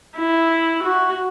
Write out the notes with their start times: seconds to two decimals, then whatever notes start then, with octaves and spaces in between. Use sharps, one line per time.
0.17 E4
0.83 F#4